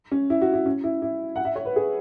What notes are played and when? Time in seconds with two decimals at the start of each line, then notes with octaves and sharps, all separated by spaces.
0.12 C#4
0.30 E4
0.41 F#4
0.53 E4
0.66 C#4
0.84 E4
1.02 E4
1.36 F#5
1.45 E5
1.56 C#5
1.65 B4
1.76 G#4